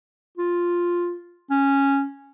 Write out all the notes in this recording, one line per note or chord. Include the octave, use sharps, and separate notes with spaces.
F4
C#4